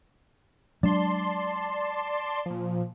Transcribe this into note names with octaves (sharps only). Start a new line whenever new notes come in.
F#3 G#3 D4 D5 A5 C6
A#2 F3